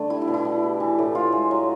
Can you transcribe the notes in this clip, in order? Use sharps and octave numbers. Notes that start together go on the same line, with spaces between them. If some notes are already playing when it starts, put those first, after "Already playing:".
Already playing: D3 A3
G3 E4
E4
B2
E4
G3
B2
E3
A2
A2 F4
G#3
F#3